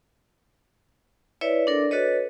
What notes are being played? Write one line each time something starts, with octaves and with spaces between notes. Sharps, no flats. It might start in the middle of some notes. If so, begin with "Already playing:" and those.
E4 B4 C#5 D5 E5
D4 A4 A#4 D5
F#4 A4 B4 C#5 D#5